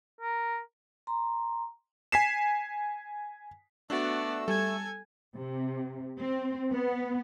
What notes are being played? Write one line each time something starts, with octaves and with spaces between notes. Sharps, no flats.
A#4
A#5 C6
G#5 B6 C7 E7
A3 B3 D4 F#4 D5 E6
G3 A4 G#5 G#6
C3
C4
B3